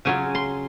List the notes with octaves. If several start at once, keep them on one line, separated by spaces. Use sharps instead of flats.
C#3 F#3 C#4 F4 G#5
C6